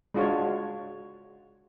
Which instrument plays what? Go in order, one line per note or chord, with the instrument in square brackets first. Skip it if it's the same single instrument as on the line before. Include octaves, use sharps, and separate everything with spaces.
[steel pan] G#3 D4 F4 F#4 C#5